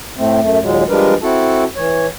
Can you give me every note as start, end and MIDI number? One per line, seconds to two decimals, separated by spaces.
0.18 0.40 45
0.18 0.40 57
0.18 0.40 60
0.41 0.59 42
0.41 0.59 57
0.61 0.83 39
0.61 0.83 46
0.61 0.83 54
0.61 0.83 56
0.89 1.14 53
0.89 1.14 55
0.89 1.14 56
0.89 1.14 62
0.89 1.14 70
0.89 1.14 71
1.23 1.64 60
1.23 1.64 64
1.23 1.64 66
1.23 1.64 69
1.23 1.64 81
1.77 2.06 52
1.77 2.06 73